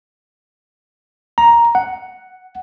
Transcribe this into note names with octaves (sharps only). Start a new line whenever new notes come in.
A#5
F#5